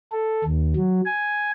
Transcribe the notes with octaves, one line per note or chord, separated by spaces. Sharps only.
A4
D#2
F#3
G#5